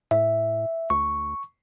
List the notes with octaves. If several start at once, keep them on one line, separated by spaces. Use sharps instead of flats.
A2 E5
D2 C#6